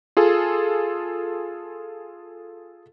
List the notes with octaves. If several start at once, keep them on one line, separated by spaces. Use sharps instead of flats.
F4 G#4 A4